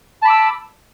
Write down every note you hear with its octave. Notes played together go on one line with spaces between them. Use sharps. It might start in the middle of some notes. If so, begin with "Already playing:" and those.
A5 B5 D6 E6